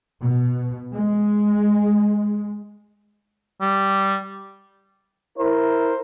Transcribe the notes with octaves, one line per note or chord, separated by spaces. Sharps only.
B2
G#3
G3
E4 A#4 C5